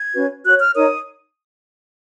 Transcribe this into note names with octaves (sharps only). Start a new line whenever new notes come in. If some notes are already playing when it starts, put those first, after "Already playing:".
Already playing: G#6
C#4 F#4 B4
F#4 C#5 F#6
F6
D#4 A#4 C#5 D#6